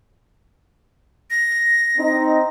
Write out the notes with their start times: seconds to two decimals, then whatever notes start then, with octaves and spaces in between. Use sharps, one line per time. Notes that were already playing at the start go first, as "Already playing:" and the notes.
1.30 A#6
1.98 C4 D#4